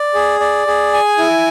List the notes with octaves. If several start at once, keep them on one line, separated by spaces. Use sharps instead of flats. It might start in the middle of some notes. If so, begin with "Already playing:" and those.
Already playing: D5
G#4
D5
G#4
G#5
E4